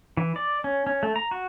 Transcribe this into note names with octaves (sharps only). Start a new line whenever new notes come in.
E3
D5
C#4
C#4
A3
A#5
F#4